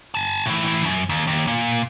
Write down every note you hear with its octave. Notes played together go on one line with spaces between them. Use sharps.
G#5 A5
A2 E3
F#2
D#2
D#2
A#2